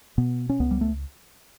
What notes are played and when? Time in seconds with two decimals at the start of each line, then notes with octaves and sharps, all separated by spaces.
0.18 B2 B3
0.49 C#4
0.60 C#2 B3
0.71 G3
0.81 A3